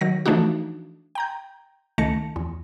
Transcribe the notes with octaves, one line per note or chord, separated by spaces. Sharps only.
D#3 F#3 A#6
E3 F3 A3 D4 D#4 F#4
G5 A#5 G6
C#2 D#3 A3 A5 A#6 C#7
E2